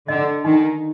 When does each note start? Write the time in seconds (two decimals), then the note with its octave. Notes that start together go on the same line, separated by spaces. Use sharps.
0.08 D3 D#5 F#5
0.44 D#3 D#4